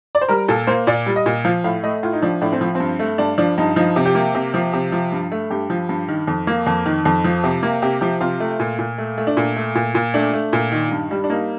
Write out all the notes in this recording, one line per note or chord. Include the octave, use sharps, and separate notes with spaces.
D5
C5
G3 A#4
A#2 A4
A#3 C5
A#2 D5
G3
D#5
A#2
F3 F5
A2 F5
A3 D#5
A2 F4
D#4
F3 D4
A2 D4
C4
F3
C4
G2
A3
G2 D4
F3 D4
G2 D#4
F3 D#4
C3
G4
A#3
C3
F3
C3
F3
G2
A3
G2 G4
F3
G2
D#3
F2
A#3
F2
D#3
F2
F3
C3
A#3
C3 G4
F3 G4
C3 F4
A3
A#2
A#2
A3
A3
D4
A#2
A3
A#2
A#2
A3 D4
A3
A#2
D#3
G2
G3
D4
A#3 D#4